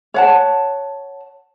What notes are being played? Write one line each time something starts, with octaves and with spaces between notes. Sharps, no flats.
C#5 F#5 A5